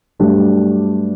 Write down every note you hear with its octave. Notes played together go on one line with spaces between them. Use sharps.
G2 F#3 A3 D4 G4